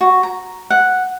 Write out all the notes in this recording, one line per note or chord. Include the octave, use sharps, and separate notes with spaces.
F#4
A#5
F#5